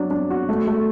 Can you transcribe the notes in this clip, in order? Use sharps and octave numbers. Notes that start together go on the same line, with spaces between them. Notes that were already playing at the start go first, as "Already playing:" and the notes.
Already playing: F#3 D4
D4
F#4
A3
A3